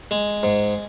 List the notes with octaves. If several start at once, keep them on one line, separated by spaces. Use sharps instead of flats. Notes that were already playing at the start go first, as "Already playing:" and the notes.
G#3
G#2